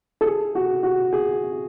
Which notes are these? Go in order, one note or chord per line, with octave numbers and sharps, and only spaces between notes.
A4
G#4
F#4
F#4
G#4